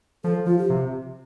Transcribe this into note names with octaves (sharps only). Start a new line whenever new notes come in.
F3 A4
F3 F4
G4
C3